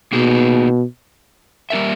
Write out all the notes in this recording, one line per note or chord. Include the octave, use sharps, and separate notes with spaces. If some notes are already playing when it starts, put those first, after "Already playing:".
B2 A#3 D#4 G#4
G3 A#3 D#4 A#4 E5